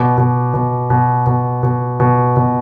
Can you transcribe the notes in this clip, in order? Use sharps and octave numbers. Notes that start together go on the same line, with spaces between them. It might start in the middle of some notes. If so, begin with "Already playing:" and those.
Already playing: B2 D6
B2
B2
B2
B2
B2
B2
B2